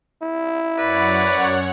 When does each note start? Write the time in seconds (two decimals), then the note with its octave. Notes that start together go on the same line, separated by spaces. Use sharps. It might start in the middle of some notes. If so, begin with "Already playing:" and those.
0.23 E4
0.78 F#2 B4 C#5 D5 F#5